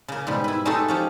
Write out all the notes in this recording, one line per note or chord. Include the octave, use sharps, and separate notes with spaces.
C#3 A#3
G#2 B2 G3
E4 B4
G#3 A3 D#4 F#4 G4 A4
F3 C#4 G4